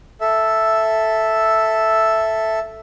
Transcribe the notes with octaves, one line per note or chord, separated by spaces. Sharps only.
A4 E5